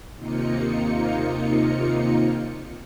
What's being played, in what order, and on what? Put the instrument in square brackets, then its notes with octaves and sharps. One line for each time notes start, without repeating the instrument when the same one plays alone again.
[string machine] D#2 C3 A#3 D#4 F4 C#7